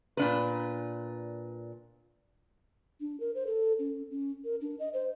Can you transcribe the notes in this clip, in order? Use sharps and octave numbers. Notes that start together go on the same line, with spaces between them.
A#2 D4 B4
D4
A#4
C5
A4
C#4
C#4
A#4
D4
D#5
C5